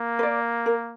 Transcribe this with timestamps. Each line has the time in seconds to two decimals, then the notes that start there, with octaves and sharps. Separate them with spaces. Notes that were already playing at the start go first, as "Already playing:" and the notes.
Already playing: A#3
0.19 B4
0.23 D5
0.66 A#4